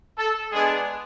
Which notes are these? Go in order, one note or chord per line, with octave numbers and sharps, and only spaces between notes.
A4
G#3 B3 D4 G#4